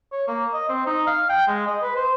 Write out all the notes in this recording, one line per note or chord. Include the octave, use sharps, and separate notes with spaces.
C#5
A#3
D#5
C4
D#4
F5
G5
G#3
D#5
B4
C5